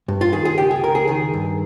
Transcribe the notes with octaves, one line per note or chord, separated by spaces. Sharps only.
G2
F4
D#3 G#4
G#4
C#2 G4
G#4
C#2 A#4
G#4
D#3 G#4
G2